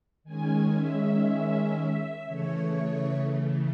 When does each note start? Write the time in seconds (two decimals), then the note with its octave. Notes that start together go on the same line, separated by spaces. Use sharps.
0.24 D#3 G#3 C#4 G#5
0.74 E5
1.25 E5
1.76 E5
2.26 C#3 E3 A3 C#5